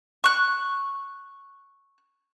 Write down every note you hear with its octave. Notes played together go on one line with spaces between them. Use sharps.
C#6 F#6